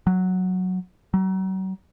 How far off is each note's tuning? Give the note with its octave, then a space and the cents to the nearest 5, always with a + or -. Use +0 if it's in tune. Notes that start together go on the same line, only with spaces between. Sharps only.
F#3 -5
F#3 +40